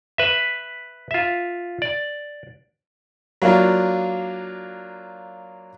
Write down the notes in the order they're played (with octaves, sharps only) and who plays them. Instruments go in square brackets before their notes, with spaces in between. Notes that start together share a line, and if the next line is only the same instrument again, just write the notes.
[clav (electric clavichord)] B4 E5
F4 E5
D5
[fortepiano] F#3 A#3 D4 F4